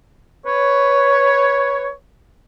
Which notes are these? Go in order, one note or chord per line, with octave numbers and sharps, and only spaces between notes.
B4 C#5